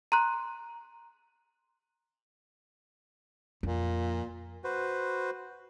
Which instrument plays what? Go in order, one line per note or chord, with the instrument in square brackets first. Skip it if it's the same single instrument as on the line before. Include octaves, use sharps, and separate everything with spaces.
[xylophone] A#5 C6 F#6
[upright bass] F2 [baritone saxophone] A#2
[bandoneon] F#4 B4 C5